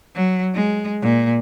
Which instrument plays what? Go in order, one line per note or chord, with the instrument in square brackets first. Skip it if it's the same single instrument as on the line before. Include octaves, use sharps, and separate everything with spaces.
[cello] F#3
G#3
A#2